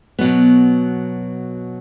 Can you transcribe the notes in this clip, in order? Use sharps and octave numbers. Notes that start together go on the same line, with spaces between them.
B2 F#3 B3